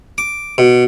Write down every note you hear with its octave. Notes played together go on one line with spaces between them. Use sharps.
D6
B2